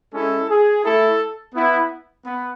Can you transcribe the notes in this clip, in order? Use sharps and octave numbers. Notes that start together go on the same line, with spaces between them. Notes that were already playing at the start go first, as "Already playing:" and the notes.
G#3 C#4 E4 A4
G#4
A3 E4 A4
B3 E4
B3